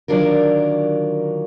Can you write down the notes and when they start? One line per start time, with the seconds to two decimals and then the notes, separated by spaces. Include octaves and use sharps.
0.08 D3 D#3 F#3 D4 F4 A#4